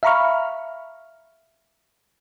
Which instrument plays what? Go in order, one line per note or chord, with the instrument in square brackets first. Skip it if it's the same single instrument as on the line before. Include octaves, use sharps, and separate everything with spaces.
[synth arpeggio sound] E5 F5 A#5 B5 C#6 F6